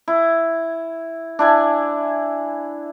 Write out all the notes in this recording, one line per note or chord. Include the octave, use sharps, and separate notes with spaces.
E4
D4 E4 G#5